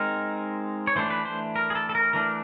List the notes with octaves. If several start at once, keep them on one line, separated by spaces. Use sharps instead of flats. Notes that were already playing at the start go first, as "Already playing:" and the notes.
Already playing: G#3 C4 D#4 A#4
C#5
E3 A3 D4 C5
B4
C5
A#4
G#4
A4
A4
A#4
E3 A3 D4 A#4